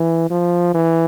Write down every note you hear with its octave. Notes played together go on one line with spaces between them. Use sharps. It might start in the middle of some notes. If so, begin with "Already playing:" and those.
Already playing: E3
F3
E3